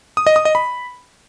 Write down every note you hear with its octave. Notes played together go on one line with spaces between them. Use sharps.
D#6
D#5
D#6
D#5
B5